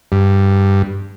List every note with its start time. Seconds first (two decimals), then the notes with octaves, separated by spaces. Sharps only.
0.12 G2